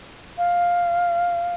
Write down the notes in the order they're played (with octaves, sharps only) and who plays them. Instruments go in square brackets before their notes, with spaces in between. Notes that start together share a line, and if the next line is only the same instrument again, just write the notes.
[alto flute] F5